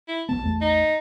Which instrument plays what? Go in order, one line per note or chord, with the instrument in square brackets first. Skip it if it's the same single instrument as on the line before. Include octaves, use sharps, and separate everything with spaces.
[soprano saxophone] E4
[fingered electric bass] A#1 F2 B3 [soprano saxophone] A5
[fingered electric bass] A1 E2 A3
[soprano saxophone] D#4